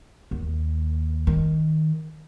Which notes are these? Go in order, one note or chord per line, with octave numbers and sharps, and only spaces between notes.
D#2
D#3